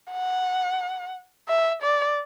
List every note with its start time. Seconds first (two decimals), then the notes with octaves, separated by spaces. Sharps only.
0.12 F#5
1.49 E5
1.83 D5